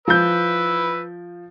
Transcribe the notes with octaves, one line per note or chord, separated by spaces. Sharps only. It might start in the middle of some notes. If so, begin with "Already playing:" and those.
F3 B4 E6 G6